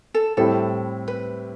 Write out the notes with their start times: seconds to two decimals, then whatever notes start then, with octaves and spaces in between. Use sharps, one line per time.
0.14 A4
0.37 A2 G3 C4 E4 A4
1.08 B4